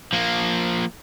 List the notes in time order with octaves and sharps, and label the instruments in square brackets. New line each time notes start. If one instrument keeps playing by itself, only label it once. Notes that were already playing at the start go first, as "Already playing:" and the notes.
[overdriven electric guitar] F3 A#3